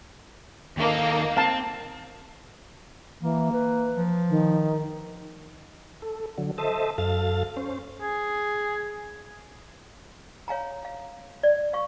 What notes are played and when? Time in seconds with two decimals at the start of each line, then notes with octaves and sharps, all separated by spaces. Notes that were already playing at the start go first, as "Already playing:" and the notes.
0.77 D#2 A#3 D#4 A4
1.37 C4 F5 A5
3.22 E3 A#3
3.52 B4
3.94 F3
4.29 D#3
6.02 A4
6.38 D3 F#3
6.58 A4 C5 D#5 E5 A5
6.98 F#2 A4 F5 A6
7.57 C#4 C5
8.02 G#4
10.48 C#5 F5 G#5 A#5
10.85 F5
11.43 D5
11.73 F5 C#6